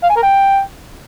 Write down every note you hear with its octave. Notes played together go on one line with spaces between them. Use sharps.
F5
G#5
A#4
G5